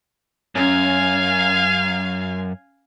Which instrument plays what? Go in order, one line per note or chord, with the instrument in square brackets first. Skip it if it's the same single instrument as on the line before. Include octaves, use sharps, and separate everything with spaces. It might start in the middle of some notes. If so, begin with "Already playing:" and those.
[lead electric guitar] F#2 [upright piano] C#4 [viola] F5 G#5